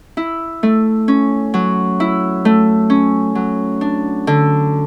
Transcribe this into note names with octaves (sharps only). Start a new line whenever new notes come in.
E4
A3
C#4
F#3
E4
A3
C#4
F#3
D4
D3